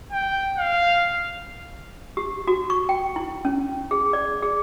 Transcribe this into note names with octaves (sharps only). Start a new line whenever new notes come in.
G5
F5
G4
F#4
C#6
G5
E4
C#4
G#4
D5
G#4